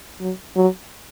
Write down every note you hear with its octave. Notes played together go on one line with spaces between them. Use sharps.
F#3
F#3